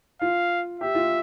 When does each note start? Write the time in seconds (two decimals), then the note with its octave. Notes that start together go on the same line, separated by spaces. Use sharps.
0.21 F4 F5
0.80 G4 E5
0.95 F4